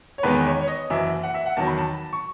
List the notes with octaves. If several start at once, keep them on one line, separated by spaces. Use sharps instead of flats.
C#5
E2 D#3 G#3 B3 B4
C#5
C#5
D#5
F#1 F#2 E3 E5
F#5
E5
F#5
E2 D#3 F#3 A5
B5
A5
C#6